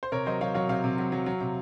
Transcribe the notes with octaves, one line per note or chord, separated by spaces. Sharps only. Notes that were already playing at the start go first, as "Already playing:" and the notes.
C5
C3 A#4 C#5
F#3 C5 D#5
F#3 C#5 F5
F#3 C#5 F5
C3 C#5 F5
C3
F#3
F#3
F#3
C3